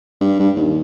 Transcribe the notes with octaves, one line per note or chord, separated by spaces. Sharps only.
G2
G2
D#2